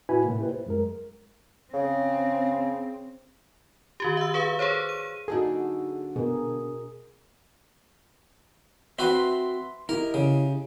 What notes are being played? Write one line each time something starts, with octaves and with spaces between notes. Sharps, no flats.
A2 E4 F#4 B4 G#5 B5
A2 C3 A#3
E4 G4 B4
C5
F#2 G#3 A#4
C#3 C4
D#3 F#4 G4
E5 E6
G#4 B4 F5
G#4 A4 C5 C#5
D#7
D3 A#3 D4 D#4 F#4 G#4 A4
B2 G#4 A#4
C4 F#4 B4 E5 C6
E4 G4 A#4 D#5
C#3